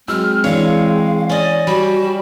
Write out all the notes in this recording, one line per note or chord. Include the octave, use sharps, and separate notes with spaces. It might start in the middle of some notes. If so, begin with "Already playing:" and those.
F#3 G#3 C4 E6 F6
E3 D4 C#5 F5
C#4 D5 D#5
G3 F#4